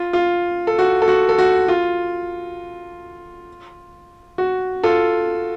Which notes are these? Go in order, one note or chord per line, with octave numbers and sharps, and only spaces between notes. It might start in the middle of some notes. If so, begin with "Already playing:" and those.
Already playing: F4
F4
A4
F#4
A4
F#4
A4
F#4
F4
F#4
F4 A4